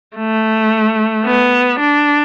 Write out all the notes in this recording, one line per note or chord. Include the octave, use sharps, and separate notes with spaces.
A3
B3
D4